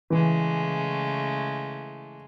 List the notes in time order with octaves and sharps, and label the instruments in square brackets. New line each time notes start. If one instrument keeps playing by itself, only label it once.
[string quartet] C#3 G#3 A3 [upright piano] E3